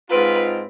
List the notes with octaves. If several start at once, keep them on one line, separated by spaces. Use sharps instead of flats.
G#2 G#3 C4 F4 B4